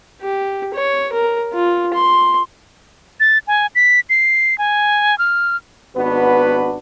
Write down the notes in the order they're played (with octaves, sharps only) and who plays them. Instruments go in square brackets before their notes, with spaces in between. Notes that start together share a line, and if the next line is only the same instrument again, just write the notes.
[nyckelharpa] G4
C#5
A#4
F4
C6
[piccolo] A6
G#5
B6
C7
G#5
F6
[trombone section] G#1 B3 D4 F#4 B4